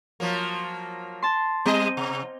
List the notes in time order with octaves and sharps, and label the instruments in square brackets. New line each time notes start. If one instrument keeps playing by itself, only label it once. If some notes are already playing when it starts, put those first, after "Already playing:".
[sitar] F3 F#3 A#3
[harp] A5 C6
[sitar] G3 D#5 [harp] C4
[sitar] C3